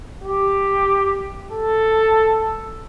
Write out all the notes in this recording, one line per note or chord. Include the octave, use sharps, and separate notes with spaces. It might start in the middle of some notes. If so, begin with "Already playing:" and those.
G4
A4